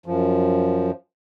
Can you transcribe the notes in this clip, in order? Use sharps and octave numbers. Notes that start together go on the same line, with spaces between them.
F#2 F3